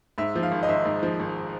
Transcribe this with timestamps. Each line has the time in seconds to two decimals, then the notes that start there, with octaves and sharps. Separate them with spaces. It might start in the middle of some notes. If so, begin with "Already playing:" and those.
0.18 G#2 E5
0.35 F3
0.43 F5
0.52 G#1
0.63 D#5
0.69 G#1 E5
0.85 G#2
1.03 F3
1.20 G#1